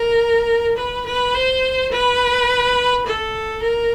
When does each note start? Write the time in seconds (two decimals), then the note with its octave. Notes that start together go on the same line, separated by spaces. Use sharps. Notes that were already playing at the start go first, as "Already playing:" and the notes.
Already playing: A#4
0.77 B4
1.06 B4
1.34 C5
1.91 B4
3.06 A4
3.62 A#4